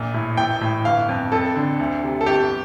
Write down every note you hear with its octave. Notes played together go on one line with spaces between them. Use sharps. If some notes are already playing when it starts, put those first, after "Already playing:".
Already playing: A#1 A#2
A2
A1 G5
A2
G1 F5
F2
F2 A4
D3
D2
C3
A4
G1 G4